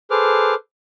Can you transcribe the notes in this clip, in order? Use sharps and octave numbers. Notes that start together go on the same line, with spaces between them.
G#4 A4 B4 C5 D6 F6